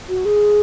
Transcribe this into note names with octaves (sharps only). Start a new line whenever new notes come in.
F#4
G#4